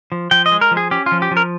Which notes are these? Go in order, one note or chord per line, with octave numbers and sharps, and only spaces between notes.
F3
F3 G5
D#5
G#3
A#4
F3
G#4
C#4 G4
F4
F3
G4
F3
A#4